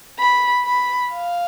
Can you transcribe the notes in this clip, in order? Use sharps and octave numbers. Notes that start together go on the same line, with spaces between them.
B5
B5
F5